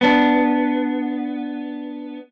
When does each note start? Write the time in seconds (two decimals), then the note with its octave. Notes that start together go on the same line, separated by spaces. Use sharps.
0.01 B3 D4